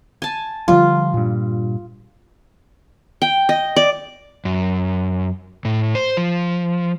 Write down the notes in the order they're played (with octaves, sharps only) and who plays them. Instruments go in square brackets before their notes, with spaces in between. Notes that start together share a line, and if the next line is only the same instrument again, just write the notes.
[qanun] G#5 A5
[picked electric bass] D3 F3 G3 [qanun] F4
[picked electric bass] G2 A#2
[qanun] G5
D#5
D5
[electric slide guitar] F#2
A2
C5
F3